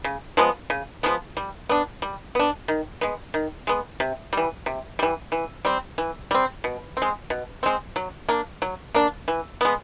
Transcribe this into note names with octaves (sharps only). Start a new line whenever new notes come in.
C#3
F3 G#3 B3
C#3
F3 G#3 B3
G3
B3 D4
G3
B3 D4
D#3
G#3 B3
D#3
G#3 B3
C3
E3 G3
C3
E3 G3
E3
G3 C4
E3
G3 C4
B2
C4
G#3
B2
G#3 C4
F#3
A#3 D4
F#3
A#3 D4
E3
G#3 B3